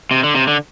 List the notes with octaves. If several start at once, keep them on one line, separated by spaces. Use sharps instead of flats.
C3
D3
C3
D3